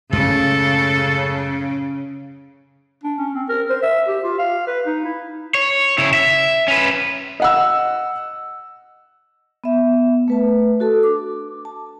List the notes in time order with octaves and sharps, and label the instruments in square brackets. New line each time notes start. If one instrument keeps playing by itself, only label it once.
[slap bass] F#2 A2 G#3 [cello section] C#3 [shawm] A4
[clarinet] D4
C#4
C4
A#4
C5
E5
G4
F4
F5
B4
D#4
E4
[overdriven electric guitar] C#5
C#3 E4
E5
C#4 B4
[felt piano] D#5 F#5 E6
[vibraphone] B3 E5
A3 B4 A5
F#4 A4 A5
D4 D6
A5